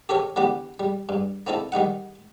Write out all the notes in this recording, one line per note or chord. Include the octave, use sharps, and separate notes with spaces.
G4 A4 A#4 C#5
D3 E3 B3 G4
G3
G2
A#3 C4 D#4 E4 A4
D#3 G3 D#4 F#5